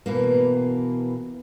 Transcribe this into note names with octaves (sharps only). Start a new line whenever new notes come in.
B2 E3 A#3